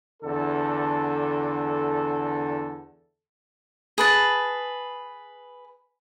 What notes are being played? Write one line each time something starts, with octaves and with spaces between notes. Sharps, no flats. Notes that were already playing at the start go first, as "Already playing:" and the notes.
E2 D3 A4
G#4 B4 A5